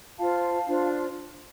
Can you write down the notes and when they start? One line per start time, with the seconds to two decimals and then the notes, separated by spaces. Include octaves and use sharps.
0.18 F4 C5 F5 A5
0.68 D4 F4 C5